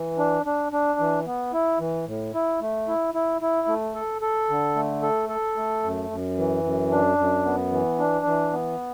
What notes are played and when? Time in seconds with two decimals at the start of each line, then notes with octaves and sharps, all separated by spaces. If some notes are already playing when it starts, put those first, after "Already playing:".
Already playing: E3
0.18 D4
0.46 D4
0.72 D4
1.00 E3
1.26 B3
1.53 E4
1.79 E3
2.06 A2
2.34 E4
2.61 A3
2.88 E4
3.14 E4
3.41 E4
3.68 A3
3.95 A4
4.22 A4
4.49 D3
4.76 A3
5.03 A4
5.29 A4
5.57 A3
5.83 F#2
6.10 F#2
6.37 E3
6.64 F#2
6.91 D4
7.18 F#2
7.45 B3
7.72 E3
7.99 D4
8.26 E3
8.52 B3